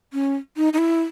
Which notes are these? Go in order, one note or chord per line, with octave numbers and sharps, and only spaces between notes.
C#4
D#4
D#4
E4